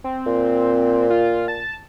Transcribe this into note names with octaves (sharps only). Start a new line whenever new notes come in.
C4
A#2
F4
A5